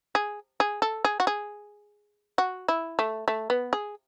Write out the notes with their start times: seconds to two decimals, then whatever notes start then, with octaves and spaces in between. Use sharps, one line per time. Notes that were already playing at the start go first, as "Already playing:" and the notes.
0.15 G#4
0.60 G#4
0.82 A4
1.05 G#4
1.20 F#4
1.27 G#4
2.38 F#4
2.68 E4
2.99 A3
3.28 A3
3.50 B3
3.73 G#4